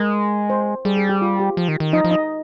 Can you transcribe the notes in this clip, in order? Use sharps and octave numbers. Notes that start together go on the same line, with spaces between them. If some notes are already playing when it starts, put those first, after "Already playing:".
Already playing: G#3 A#4
C5
G3 G#4
G#4
G4
F4
G4
F3
D#3
D#3
F3 D#4 D#5
F3
D#4 D#5